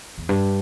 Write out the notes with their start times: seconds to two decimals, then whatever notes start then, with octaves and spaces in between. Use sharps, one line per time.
0.18 E2
0.29 G2